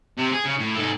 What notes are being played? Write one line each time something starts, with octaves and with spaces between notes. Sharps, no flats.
C3
G#4
C#3
A2
G#2 A4